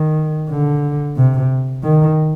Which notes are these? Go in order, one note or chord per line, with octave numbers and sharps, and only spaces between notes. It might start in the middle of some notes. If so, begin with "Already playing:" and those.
Already playing: D#3
D3
C3
D#3